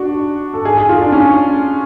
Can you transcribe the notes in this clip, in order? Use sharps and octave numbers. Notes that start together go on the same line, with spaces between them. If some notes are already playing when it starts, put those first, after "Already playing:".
Already playing: D4 F#4
A4
G#4
G#4
F4
D4
C#4